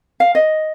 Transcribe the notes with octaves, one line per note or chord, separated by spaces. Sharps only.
F5
D#5